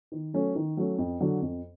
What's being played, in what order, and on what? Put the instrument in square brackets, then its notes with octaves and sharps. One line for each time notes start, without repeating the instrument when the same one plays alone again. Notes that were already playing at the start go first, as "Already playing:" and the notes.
[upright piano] D#3
F#3 A3 C#4
D#3
F#3 A3 C#4
F2
D3 F#3
F2